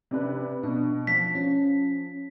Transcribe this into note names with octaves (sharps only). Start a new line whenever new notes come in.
C3 D4 B4
B2 D4
F3 B6
C#4